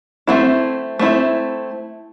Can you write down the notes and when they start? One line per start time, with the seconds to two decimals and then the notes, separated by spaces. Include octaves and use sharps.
0.27 A3 C4 E4
0.99 A3 C4 E4